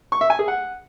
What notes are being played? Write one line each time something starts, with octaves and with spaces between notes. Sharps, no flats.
C#6
E5
G#5
G#4
F#5